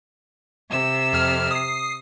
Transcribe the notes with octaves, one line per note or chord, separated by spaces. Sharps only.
C3 E6
F2 F6
D#6 C7